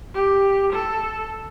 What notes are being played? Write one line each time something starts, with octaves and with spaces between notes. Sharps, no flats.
G4
A4